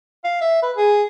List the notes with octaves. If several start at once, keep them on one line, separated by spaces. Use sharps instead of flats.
F5
E5
B4
G#4